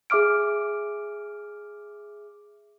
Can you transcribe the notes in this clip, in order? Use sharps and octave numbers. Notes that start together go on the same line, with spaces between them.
G#4 E5 D6 F6 D7